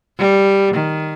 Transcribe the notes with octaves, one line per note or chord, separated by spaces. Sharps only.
G3
D#3